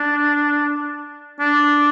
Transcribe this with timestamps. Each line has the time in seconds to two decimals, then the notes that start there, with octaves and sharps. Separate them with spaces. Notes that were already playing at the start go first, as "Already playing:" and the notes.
Already playing: D4
1.40 D4